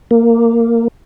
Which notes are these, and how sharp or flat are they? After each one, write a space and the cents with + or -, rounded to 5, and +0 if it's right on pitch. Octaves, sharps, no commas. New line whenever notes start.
A#3 -10